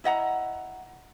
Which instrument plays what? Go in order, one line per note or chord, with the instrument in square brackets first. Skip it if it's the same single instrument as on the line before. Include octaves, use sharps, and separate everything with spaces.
[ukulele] E4 D#5 F#5 A#5